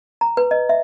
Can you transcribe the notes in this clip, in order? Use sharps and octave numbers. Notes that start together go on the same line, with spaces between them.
A#5
B4
D#5
E5